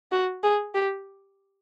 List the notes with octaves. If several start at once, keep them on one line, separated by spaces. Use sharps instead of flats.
F#4
G#4
G4